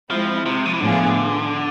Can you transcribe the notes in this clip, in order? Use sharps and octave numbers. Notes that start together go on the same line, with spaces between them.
F3 G#3 C4 E4
C3
F3
E3
A2 D3 F3 B3 F4 G#4